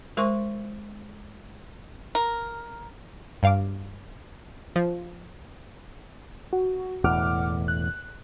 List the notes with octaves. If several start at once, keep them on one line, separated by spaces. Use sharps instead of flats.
G#3 A#4 C5 C6 C#6
A#4
G2 F5 D6
F3
F#4
E1 E2 A2 F#5 D6 F6
F#6